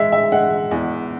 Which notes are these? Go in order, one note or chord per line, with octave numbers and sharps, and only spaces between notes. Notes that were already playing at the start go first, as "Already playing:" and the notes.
Already playing: G#3 E5
E5
G#3 F#5
E2